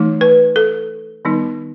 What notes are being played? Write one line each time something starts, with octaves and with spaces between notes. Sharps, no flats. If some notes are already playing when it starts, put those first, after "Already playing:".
Already playing: E3 A3 D#4
B4
A4
D#3 G3 B3 D#4